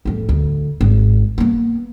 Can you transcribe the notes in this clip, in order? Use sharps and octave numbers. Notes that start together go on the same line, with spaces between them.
F2 A2
D2
G#1
A#3 B3